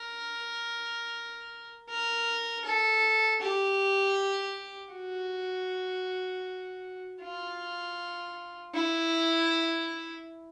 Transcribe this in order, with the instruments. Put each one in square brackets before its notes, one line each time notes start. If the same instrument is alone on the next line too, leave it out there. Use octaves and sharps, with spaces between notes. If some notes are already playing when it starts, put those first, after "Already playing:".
Already playing: [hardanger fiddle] A#4
A#4
A4
G4
F#4
F4
E4